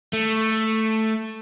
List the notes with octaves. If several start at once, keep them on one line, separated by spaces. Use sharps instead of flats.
A3